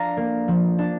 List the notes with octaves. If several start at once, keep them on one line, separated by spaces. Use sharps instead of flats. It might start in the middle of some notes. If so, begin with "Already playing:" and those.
Already playing: F3 D4 F5 A#5
A#3
F3
D4